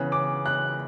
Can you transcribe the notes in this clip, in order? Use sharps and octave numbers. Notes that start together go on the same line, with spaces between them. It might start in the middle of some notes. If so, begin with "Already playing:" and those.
Already playing: C#3 E3 B3 F#6
D6
F#6